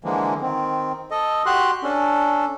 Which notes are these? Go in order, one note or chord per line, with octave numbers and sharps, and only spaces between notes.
D3 E3 F3 G#3 A#3
D#3 C4
A4 D#5
F#4 G4 C6 F#6
C#4 D4 A4